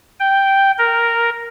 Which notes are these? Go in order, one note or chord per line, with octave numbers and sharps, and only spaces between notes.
G5
A#4